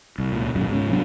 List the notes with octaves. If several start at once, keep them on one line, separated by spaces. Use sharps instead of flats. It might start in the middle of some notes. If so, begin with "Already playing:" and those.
C2
C#2 A#2
G#1 F#2 B2
G#2 C#3
C2 F#3 B3 D4